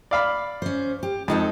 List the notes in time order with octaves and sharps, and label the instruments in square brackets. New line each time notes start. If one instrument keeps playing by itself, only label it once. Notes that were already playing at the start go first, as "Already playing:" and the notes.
[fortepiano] D5 F5 B5
[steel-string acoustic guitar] C#4 C5
G4
[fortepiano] F2 [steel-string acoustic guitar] G#3 D#4 A4